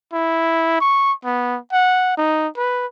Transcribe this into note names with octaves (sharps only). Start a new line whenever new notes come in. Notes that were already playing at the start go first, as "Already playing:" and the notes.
E4
C#6
B3
F#5
D#4
B4